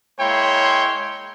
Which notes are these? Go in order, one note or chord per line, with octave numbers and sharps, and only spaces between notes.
G#3 A#3 E4 C#5 G5 C6